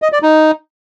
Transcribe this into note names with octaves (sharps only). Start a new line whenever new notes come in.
D#5
D5
D#4